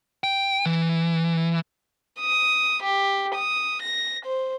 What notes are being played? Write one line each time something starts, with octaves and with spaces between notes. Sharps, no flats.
G5
E3
D#6
G4
D#6
A#6
C5